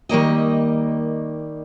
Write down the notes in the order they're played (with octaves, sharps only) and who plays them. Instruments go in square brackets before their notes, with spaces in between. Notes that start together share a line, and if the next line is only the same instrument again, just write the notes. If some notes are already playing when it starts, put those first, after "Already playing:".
[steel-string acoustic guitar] D#3 G3 A#3 D#5